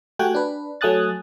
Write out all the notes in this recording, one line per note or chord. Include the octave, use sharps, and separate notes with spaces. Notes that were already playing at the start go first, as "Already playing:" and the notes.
A3 F#4 G4 G5 G#5 F#6
D4 B4
F#3 A3 G#5 D#6 F#6 A6